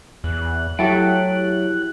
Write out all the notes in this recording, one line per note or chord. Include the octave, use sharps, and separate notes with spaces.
E2 F#6
F#3 A3 E4 F#4 G4 A4 G5